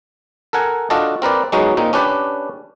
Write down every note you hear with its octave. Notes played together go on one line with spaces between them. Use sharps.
A4 A#4 F#5 G#5
D4 F4 F#4 A4 D#5 A5
C4 A#4 B4 D5
F#3 G#3 B3 C#4 D#4 F#4
A#2 C4 D#4
C#4 D4 G4 B4 D5